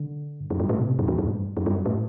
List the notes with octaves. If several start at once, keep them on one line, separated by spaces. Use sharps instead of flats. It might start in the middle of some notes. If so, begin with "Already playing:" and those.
Already playing: D3
G2
F#2
G2
A2
C3
A2
F#2
E2
F#2
A2
G2
F#2
G2
F#2
A2